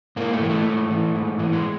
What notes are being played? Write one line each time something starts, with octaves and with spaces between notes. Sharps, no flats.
G#2 A#3
A3
E3 G#3
A3
G#2
E3
G#2
E3
G#3